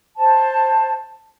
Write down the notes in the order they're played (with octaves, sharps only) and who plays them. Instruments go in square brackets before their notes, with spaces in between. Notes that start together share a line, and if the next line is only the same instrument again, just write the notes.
[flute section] C5 A5